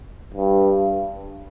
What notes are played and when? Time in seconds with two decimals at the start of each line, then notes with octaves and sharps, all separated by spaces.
0.34 G2